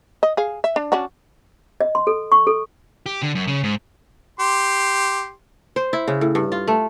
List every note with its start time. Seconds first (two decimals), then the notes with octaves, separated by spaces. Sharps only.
0.23 D#5
0.37 G#4 F5
0.64 E5
0.76 D4
0.92 C#4 D4 F#4
1.81 D#5
1.95 C6
2.07 A4
2.32 C#6
2.47 A4
3.06 G4
3.23 D3
3.35 F#2
3.47 C#3
3.63 G#2
4.40 G4 C6
5.76 C5
5.93 E4
6.08 C#3
6.21 A2
6.35 G2
6.52 F4
6.67 A3